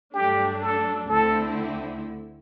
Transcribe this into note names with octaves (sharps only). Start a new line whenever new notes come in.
G2 F#3 A3 D4 G4
A4
D2 D3 A3 C4 E4 A4